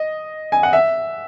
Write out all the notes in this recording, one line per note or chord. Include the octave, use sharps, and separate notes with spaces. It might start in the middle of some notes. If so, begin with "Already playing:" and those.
Already playing: D#5
G#5
F#5
E5